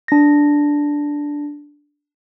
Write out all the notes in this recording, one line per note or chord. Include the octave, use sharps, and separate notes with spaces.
D4 A#6